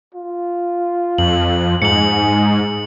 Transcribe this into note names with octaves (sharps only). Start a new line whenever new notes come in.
F4
F2 F#7
G#2 G#4 C#7 F#7